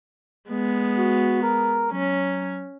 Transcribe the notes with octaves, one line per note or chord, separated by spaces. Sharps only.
G#3 B3
F#4
A#4
F#3 C#4